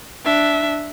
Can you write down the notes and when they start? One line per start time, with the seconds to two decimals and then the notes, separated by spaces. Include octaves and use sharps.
0.24 D4 E5